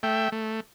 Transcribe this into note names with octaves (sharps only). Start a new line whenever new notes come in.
A3 E5 G5
A3